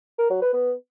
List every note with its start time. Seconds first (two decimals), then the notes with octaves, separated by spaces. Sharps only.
0.19 A#4
0.30 F#3
0.42 B4
0.54 B3